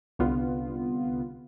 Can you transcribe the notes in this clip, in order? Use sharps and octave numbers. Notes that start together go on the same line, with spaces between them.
C2 D3 B3 F4